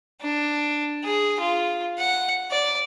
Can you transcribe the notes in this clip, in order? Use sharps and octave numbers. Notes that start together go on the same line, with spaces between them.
D4
G#4
F4
F#5
D5